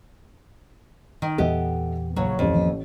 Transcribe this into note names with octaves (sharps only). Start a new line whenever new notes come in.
D#3
E2 A#2 E3 B3 G4 A4 D#5 E5
A#1 C#3 F#3 C#5
D1 A1 F2 C#5
D#3 F3 A#3